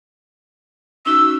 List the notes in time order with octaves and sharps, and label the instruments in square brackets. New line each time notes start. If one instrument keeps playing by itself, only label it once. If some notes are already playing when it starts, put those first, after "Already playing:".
[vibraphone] C#4 D#4 F#4 [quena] E6